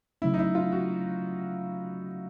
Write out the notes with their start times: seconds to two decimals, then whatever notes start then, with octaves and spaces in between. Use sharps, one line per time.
0.22 C#3 F#3 A3 C#4 E4
0.34 D#4
0.39 E4
0.55 F4
0.72 F#4